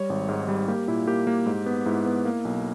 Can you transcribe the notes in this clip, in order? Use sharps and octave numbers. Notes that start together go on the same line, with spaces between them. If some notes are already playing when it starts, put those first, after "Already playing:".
Already playing: G3 C#5
G#1
G#2
G3
A#3 G4
A#2 E4
A#3 G4
A#3
G#2
B3
G#2 E4
B3
A#3
B1